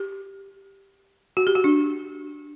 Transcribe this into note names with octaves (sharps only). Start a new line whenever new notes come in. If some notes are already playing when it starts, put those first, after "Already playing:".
Already playing: G4
F#4
G4
F#4
D4